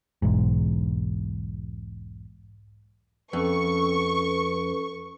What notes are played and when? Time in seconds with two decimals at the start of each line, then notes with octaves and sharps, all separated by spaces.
0.22 B1 E2 G#2
3.33 F2 C#4 A4 B4 C#6